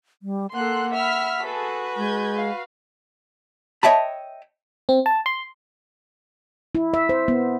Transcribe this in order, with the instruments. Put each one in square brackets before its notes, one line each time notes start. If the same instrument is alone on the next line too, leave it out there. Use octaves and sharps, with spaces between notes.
[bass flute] G3
[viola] A#3 A4 [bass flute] F#5 [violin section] C6 F#6
[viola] E5 [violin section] B5 F6 B6
[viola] F#4 B4 [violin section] G#4 A4
[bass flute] G#3 [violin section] G6 G#6
[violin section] F5
[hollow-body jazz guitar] C#5 D#5 E5 G5 A5 B5
[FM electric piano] C4
A5
C6
[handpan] E4
E5
C5
B3